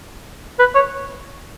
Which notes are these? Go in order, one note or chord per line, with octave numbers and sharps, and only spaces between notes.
B4
C#5